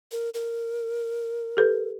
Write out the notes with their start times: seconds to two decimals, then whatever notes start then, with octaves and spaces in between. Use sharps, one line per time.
0.12 A#4
0.34 A#4
1.57 G4 A4 B4